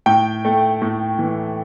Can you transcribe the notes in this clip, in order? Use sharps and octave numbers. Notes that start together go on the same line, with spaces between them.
A2 G5
A3
A2
E3